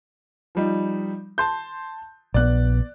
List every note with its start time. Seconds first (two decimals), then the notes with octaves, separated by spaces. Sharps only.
0.55 F3 G3 D#4
1.38 A5 C6 G6
2.34 A#1 B3 D5 F#6